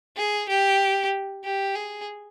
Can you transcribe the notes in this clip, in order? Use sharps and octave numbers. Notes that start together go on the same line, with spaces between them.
G#4
G4
G4
G#4